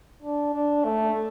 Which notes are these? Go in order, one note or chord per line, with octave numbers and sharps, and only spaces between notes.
D4
D4
A3